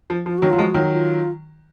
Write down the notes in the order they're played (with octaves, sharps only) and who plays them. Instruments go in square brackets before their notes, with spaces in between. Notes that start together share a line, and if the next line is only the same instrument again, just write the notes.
[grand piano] F3
[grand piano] F3 [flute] F4
[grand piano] D#3 F#3 [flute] F#4
[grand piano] F#3 [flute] F4
[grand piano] F3 G#3
[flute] F#4
[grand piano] D#3 F#3 [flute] F4
[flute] F4